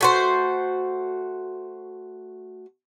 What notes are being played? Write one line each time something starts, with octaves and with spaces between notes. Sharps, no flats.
A3 F#4 C5